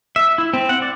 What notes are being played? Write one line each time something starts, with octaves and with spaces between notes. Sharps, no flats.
E5
E4
C4
F#5
D5